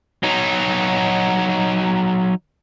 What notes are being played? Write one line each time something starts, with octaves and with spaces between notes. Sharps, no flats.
F#3 D#4